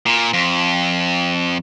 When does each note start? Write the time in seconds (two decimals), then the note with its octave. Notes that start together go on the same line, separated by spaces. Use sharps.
0.06 A#2
0.33 F2